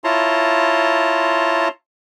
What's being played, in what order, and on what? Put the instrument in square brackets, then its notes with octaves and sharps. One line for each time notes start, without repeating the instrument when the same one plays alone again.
[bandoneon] E4 F4 C#5 A5 A#5 C6